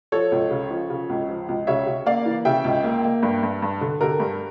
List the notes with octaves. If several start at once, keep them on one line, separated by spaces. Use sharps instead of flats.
F3 A4 C#5
C#2
C#3
F3
C#3
C#2
F3
C#2
C#3 C#5 E5
C#3
A#3 D5 F5
E3
C#3 E5 G5
C#2
A#3
A#3
G2
G2
G2
D3
D3 G4 A#4
G2